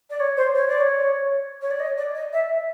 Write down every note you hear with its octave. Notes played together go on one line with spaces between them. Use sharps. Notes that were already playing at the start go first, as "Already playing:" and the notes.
D5
C#5
C5
C#5
D5
C#5
C#5
D5
D#5
D5
D#5
E5